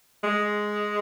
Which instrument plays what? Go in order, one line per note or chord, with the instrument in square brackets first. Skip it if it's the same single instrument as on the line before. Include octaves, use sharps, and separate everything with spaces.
[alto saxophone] G#3